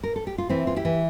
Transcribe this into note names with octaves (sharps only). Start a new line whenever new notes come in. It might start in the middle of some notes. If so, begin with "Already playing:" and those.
A#4
A4
G4
F4
E3 C4 E4
E3 F4
E4 G4
E3